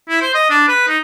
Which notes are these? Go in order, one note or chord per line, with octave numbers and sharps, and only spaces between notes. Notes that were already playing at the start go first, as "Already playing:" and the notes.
E4
C5
D#5
D4
B4
D#4